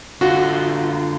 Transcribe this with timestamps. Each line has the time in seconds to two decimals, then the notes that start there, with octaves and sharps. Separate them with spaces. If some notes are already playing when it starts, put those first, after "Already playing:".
0.21 D3 F4 F#4